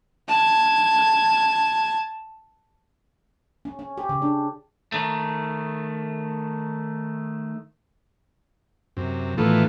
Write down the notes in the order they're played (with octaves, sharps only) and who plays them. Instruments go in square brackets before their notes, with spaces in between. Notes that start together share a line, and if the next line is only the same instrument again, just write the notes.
[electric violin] A5 G#6
[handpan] C#4
C#4
G4
C#3
D4
[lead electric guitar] D#3 A3
[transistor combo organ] F#2 C3
A2 D#3 E3 A3 B3 F4